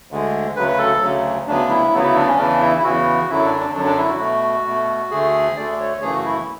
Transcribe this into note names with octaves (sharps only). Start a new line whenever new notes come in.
D2 D3 G#3
D2 C#3 F#3 B4
B4
A4
D2 C#3 F#3
D2 C#3 F#3 B3 D4
E4
D2 C#3 F#3 B3
E4
D4
C#4
E2 C#3 E3 D4
E4
E4
E2 C#3 E3 F#4
F#2 D3 F#3 E4
D4
D4
F#2 D3 F#3 D4
D4
E4
F#4
B2 A3
B2 A3
D2 D3 A3 G#4
D2 D3 A3 D5
D5
C#5
F#2 C#3 E3 A3 G#4
F#4
E4